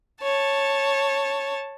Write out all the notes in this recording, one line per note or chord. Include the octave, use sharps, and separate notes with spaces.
C#5 A5